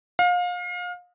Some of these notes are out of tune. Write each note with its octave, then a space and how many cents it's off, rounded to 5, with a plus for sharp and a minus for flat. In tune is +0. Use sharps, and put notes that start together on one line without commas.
F5 +30